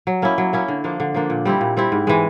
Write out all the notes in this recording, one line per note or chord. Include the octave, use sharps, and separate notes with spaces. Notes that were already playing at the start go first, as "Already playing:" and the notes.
F#3
A#3 C#4 E4
F#3
A#3 C#4 E4
D3
F3 A#3 D4
D3
F3 A#3 D4
A#2
G3 C4 E4
A#2
G3 C4 E4
G#2
E3 G#3